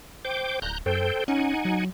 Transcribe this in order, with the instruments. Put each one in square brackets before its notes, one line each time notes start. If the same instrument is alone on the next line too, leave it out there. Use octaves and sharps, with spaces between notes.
[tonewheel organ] C5 G5 D6
[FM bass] D1 [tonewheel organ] A#5 F#6 G6
[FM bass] F#2 [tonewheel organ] A4 C5 G5
[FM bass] C#4 [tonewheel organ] D#4 F#5 G#5
[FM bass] F#3